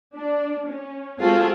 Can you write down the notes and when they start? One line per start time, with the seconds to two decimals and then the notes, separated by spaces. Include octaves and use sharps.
0.15 D4
0.68 C#4
1.19 G#3 C4 F4 F#4 G#4 A4